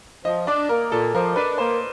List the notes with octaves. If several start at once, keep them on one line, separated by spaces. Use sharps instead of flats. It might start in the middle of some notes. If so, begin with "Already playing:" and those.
F3 D#5
D4 D5
A#3 A#4
A#2 A4
F3 A#4
D4 B4
A#3 C5